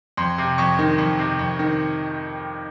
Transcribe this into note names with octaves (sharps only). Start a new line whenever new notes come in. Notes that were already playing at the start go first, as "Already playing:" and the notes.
F2 C6
C3
F2 C#6
D#3
F2
C3
F2
D#3